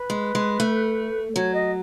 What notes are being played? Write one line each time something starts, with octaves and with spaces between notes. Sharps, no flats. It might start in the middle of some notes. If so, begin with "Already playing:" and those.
Already playing: B4
G#3
G#3
A3
F#3 C#5
D#5